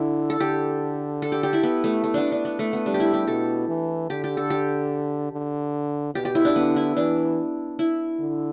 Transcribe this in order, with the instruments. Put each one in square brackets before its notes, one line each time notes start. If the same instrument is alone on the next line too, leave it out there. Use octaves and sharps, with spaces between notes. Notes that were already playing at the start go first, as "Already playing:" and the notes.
Already playing: [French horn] D3 [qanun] E4
[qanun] A4
[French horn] D3 [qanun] G4
[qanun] A4
G4
G4
E4
B3
A3
A3
B3 D4
D4
B3
A3
B3
[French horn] G3 [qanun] D4
[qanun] G4
E4
G4
[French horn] B2 [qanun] A4
[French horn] E3
[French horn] D3 [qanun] G4
[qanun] G4
A4
G4
[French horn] D3
[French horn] B2 [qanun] G4
[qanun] G4
E4
D4
[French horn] D3 [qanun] B3
[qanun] E4
[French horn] E3 [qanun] D4
[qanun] E4
[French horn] D3